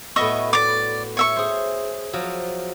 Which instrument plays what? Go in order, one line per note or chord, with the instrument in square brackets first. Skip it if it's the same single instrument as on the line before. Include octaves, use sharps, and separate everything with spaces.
[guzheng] A2 B3 F#4 [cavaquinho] D#5 E5 C#6
[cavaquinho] D5 D6
C#5 E5 C#6
[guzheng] G#4 C5
F3 F#3